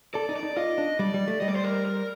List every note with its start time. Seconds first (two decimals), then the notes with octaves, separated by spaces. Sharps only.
0.14 A4 D5
0.29 D#4
0.36 D5
0.43 D#4
0.57 F4 D#5
0.78 D4
0.99 G3 D5
1.14 G3
1.28 A3
1.41 G3 D#5
1.49 D5
1.56 C5
1.64 A#4
1.85 A#4